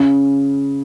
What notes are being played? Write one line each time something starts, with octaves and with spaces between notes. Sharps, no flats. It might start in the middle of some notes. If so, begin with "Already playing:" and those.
Already playing: C#3